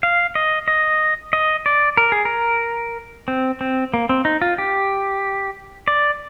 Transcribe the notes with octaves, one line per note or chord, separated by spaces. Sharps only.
F5
D#5
D#5
D#5
D5
A#4
G#4
A#4
C4
C4
A#3
C4
D#4
F4
G4
D5